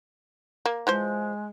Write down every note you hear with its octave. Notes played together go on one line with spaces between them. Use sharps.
A#3
E3 F3 G#3 C5